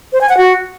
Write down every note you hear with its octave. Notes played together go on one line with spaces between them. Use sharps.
C5
G#5
F#5
F#4